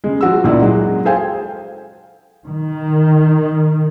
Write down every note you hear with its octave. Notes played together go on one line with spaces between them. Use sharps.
C#3 G#3
F3 F#4 E6
C#2 A#2 D#4 E4 D5
F#3 G#3
G#4 A4 C5 F5 G5 G#5
D#3